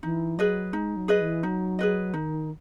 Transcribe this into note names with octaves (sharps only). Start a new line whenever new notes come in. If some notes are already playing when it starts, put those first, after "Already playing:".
E3 D#4
F#3 G#4 B4 D#5
G#3 D#4
F#3
G#4 B4 D#5
E3
F#3 D#4
G#4 B4 D#5
D#3 D#4